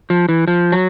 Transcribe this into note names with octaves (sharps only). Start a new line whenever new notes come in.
F3
E3
F3
F#3